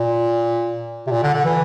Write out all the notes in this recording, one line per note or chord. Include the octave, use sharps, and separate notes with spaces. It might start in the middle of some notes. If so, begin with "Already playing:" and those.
Already playing: A#2
C3
A#2
D3
D3
E3